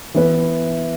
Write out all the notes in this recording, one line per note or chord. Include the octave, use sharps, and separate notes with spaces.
E3 B3 E4 B4